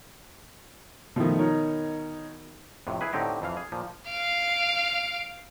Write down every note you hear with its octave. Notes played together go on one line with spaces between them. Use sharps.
B2 D#3 F3 A3
D#4 A#4 C#5
F2 A2 C3
E4 G#4 B4
A2 D3 C4 D#4 G4
F2 E3 F5
G#4
A#2 F3
F5 D7